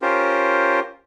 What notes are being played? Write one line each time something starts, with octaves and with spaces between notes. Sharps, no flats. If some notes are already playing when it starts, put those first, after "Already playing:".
C#4 F4 G4 A#4 C5